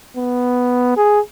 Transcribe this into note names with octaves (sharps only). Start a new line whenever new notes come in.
B3
G#4